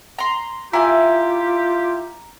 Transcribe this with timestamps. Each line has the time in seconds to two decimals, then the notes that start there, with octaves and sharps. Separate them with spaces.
0.18 A#5 C6
0.73 E4 F4 G4 G#5 A#5